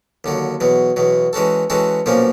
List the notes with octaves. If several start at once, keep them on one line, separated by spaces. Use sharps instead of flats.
D#2 D3 F#3
E2 B2 F#3
E2 B2 F#3
E3 G#3 C#4 F#4 A4
E3 G#3 C#4 F#4 A4
B1 A#2 F3 A#3 C#4